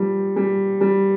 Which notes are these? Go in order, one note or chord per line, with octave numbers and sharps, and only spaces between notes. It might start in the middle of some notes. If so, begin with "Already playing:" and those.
Already playing: F3 G3
G3
G3